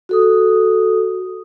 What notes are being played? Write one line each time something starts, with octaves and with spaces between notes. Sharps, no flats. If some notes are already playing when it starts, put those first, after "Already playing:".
F#4 A4 D#6